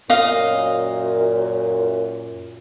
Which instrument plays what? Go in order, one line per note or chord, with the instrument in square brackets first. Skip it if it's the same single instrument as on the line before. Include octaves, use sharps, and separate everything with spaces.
[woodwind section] F#2 A#2 [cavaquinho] D#5 F5